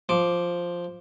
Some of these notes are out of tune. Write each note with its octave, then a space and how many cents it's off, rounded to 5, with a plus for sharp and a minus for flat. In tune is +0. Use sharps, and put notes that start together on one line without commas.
F3 +0 D6 +0